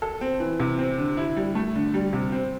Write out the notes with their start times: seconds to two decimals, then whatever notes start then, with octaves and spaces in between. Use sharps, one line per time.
0.02 A4
0.21 C4
0.40 E3
0.59 C3
0.78 C4
0.98 D3
1.17 E4
1.37 G3
1.55 A3
1.75 D3
1.94 G3
2.13 C3
2.32 C4